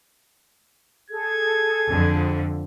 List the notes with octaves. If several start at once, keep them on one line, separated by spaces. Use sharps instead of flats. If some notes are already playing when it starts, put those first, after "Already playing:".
G#4 A4 G#6
F2 D3 F3